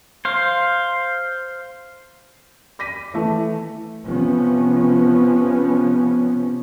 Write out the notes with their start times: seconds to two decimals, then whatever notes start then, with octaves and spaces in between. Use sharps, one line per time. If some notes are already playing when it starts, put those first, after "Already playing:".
0.25 C5 F5
2.79 D6 A#6 B6 D#7
3.14 E3 A3
4.05 C3 F3 B3 C#4